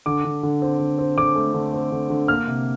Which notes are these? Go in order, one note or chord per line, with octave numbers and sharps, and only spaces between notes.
D3 D6
D3
D3
C4
D3
C4
D3 D6
A3
D3
C4
D3
D3
A#3 F6
C3